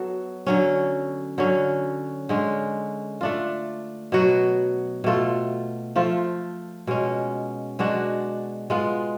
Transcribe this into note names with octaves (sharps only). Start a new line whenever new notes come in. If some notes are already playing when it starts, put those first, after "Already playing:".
Already playing: F#3 B3 F#4 A4
D3 F#3 C#4
D3 F#3 C#4
D3 G#3 C#4
A3 D4 F4
B2 F#3 B3 F#4
B2 A3 F4
F3 A3 F4
B2 G#3 C#4
B2 G#3 D4 F#4
G#3 B3 F4